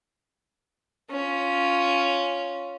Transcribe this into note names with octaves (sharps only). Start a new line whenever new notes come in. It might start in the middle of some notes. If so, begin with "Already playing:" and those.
C#4 F4